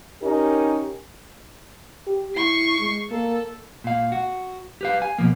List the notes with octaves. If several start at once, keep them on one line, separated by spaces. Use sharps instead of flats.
C#4 D#4 G4 A#4
G4
E4 C#6 C7
G#3
A#3 A4
A#2 F5
F#4
G4 B4 F5
G#5
B2 F3 A#3